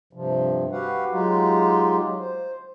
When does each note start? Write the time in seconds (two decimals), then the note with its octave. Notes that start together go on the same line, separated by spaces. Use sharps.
0.13 G2 C3 F3
0.72 F#4 G4 B4 F5 F#5
1.11 F#3 G#3 D#4 F4 G4
2.19 C5